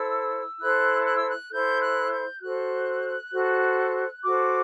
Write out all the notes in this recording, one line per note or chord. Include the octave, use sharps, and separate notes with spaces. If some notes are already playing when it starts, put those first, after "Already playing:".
Already playing: E4 A4 C5 E6
E4 A4 C5 F#6
F#6
E6
F#6
E4 A4 C5 G6
F#6
G6
F#4 A4 C5 F#6
F#4 A4 C5
F#4 A4 C5 D6